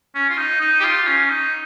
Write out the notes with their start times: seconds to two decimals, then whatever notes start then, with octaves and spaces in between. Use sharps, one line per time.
0.15 C#4
0.30 F4
0.37 D#4
0.61 D#4
0.80 G4
0.84 F4
1.07 C#4
1.30 D#4